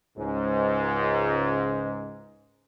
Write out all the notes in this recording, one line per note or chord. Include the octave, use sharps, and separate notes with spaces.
C#2 G#2